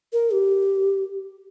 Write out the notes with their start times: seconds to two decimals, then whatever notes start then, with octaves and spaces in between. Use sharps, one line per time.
0.13 A#4
0.33 G4